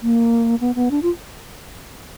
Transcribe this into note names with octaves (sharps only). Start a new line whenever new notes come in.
A#3
B3
B3
D4
F4